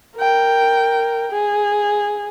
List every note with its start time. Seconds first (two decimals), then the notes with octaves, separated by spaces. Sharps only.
0.17 A#4 G5
1.32 G#4